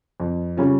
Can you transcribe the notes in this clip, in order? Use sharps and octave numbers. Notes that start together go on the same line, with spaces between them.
F2
C#3 G3 C#4 F4